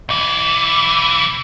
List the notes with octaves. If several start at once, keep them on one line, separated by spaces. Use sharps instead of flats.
B1 E3